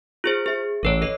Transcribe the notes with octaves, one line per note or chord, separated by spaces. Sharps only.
F4 G#4 C5
G#4 E5
A1 A4 B4 C#5
A4 D#5 C7